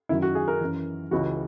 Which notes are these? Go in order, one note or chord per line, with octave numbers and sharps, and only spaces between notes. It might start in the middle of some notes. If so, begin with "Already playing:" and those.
F#2 D#3 F#3 E4
F#4
G#4
A#4
F#2 E3
C#2 C#3 E3 F#4